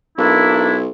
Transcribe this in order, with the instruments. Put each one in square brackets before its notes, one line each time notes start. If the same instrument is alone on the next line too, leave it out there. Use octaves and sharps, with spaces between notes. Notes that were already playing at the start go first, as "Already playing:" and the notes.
[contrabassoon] B1 [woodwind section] A#3 D4 E4